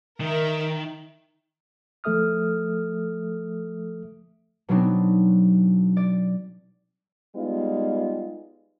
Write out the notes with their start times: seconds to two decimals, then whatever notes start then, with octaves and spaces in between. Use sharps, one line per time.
0.21 D#3 A#4 E5
2.04 F3 A3 A4 E5 D#6 F6
4.69 B2 F#3 B3 C4 D4 D#4
5.97 D5
7.35 G3 G#3 B3 D#4 F4